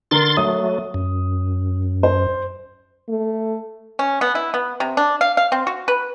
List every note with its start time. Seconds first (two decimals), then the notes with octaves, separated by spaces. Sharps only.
0.11 D3 A#4 C6 A6
0.37 F#3 A3 D#6
0.94 F#2
2.03 C5
3.09 A3
3.99 C#4
4.21 B3
4.35 E4
4.54 B3
4.80 C3
4.97 D4
5.21 F5
5.37 F5
5.52 C4
5.67 F#4
5.88 B4